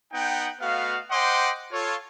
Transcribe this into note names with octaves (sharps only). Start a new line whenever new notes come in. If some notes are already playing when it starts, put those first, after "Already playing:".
B3 D#4 F#5 G5
A3 B3 F#4 D#5 F5
C5 D#5 F#5 G5 C6 D6
F4 A4 C#5